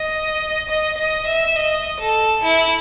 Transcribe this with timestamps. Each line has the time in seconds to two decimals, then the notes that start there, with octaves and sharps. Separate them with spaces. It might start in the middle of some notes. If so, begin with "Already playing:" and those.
Already playing: D#5
0.69 D#5
0.97 D#5
1.27 E5
1.56 D#5
2.00 A4
2.43 E4